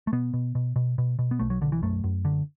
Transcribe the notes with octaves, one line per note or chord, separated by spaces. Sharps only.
A3
B2 B3
B2
B2
B2
B2
B2
B3
B1 A3
F#3
B1 D3
E3
F#2 A3
F#2
D3